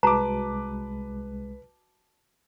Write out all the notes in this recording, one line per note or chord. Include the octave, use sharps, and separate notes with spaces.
C2 G#3 F#4 B4 A5 A#5 D6